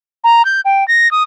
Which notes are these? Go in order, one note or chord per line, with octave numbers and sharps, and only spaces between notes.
A#5
G6
G5
A#6
D#6